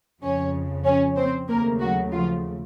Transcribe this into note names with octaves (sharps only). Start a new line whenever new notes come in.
F2 C#3 F3 C#4 C#5
C#4 C#5
C4 C5
D#2 C#3 F#3 A3 A#3 A#4
F#3 F#4
F3 F4